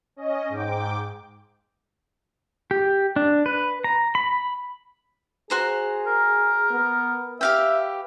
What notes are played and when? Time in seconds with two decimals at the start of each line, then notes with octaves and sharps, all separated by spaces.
0.16 C#4 D#5
0.49 G#2 G5 D6
2.71 G4
3.16 D4
3.46 B4
3.84 A#5
4.15 B5
5.50 F#4 G#4 C5 A#5
6.07 A#4
6.71 B3
7.41 G4 B4 E5 F5 G5